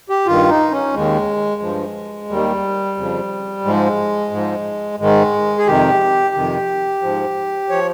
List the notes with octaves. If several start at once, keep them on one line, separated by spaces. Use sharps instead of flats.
G4
G2 D#3 F4
D#4
C#4
D#2 D#3 G#3
G2 F3
D#2 D#3 G3
F2 C#3 F3
G#2 F3 G#3
G#2 F3
G#2 D#3 G#3
G#4
F2 C3 D#3 G4
F2 C3 D#3
G#2 F3
F3 C#5